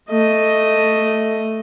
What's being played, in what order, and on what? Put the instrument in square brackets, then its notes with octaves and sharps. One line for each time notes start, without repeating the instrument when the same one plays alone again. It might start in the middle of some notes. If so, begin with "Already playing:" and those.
[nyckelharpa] A3 D#5